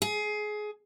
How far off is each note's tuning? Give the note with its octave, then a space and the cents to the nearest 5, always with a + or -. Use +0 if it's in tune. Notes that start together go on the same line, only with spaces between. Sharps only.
G#4 +20